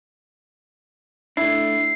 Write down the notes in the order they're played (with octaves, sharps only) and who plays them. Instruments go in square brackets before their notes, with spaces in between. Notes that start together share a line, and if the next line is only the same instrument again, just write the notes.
[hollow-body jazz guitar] A3 D4 [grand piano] E4 [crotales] C7